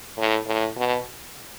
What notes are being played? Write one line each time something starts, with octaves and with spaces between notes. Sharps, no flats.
A2
A2
B2